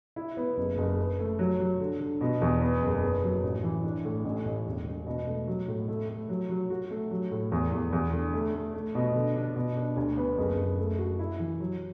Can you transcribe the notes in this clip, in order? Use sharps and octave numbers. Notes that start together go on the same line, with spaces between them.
E4
B3
F#1
F#1
B4
A3
F#3
F#3
D3
D3
B2
E2
B3
F#1
B3
F#3
A1
E3
D4
A2
A1
A1
E1
E1
B2
A3
F#3
A2
A3
A3
F#3
F#3
F#4
A3
F#3
A2
E2
E2
E2
D3
A3
A3
A3
B2
D3
D4
B2
D4
D2
B3
F#1
F#1
A3
F#4
E4
E3
F#3